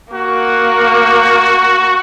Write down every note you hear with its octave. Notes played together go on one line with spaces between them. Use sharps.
A#3 F#4